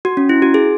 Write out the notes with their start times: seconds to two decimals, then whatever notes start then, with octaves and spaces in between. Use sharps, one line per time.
0.05 F#4
0.17 C#4
0.29 E4
0.42 F#4
0.54 G#4